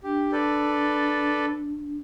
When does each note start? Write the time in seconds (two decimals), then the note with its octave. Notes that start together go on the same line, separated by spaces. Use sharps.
0.03 D4 G4
0.32 A4 B4 D5